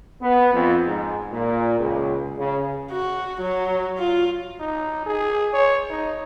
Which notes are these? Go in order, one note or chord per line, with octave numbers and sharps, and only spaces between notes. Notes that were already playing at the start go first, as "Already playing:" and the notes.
B3
F2
G#2
A#2
C#2
C#3
F#4
F#3
F4
D#4
G#4
C#5
D#4